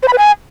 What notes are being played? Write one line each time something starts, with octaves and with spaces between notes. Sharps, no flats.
C5
B5
B4
G#5